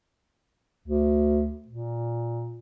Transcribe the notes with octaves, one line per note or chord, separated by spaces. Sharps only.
D2
A#2